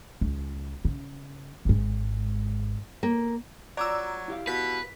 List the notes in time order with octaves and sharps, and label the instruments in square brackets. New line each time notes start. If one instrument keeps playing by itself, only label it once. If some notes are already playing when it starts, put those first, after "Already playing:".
[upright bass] C#2
C#3
G#1 G#2
[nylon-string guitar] A#3
[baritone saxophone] F#3 [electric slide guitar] F4 A#5 [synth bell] D5 D6 E6
[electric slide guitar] E4 G4 F5
[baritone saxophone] B2 [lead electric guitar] B4 [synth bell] B6